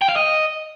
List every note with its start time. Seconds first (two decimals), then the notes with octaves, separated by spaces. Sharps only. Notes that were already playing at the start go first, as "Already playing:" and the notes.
0.02 G5
0.09 F5
0.16 D#5